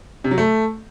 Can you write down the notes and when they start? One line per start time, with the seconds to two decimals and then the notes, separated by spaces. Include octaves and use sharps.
0.24 C3
0.31 F#3
0.38 A3